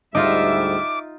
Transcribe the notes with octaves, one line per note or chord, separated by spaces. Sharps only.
D2 G#2 G3 D#4 F4 E5 D6